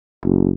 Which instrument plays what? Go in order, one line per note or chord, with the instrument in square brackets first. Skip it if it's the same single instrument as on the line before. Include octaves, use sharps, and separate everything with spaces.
[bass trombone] F#1